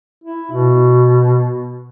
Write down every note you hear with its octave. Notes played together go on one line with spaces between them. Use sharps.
E4
B2